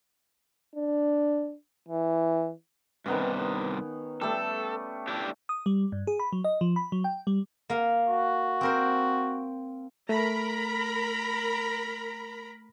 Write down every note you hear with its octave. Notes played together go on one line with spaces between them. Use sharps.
D4
E3
G2 C3 D#3 B3 C#4
G3 A3 A4
D4 E4 G4
D#6
G3
G2
G#4
B5
F#3
D#5
F3
B5
F#3
G5
G3
A#3 F5
F#4
C4 A#4 C5
A3 A#4 A#5 B5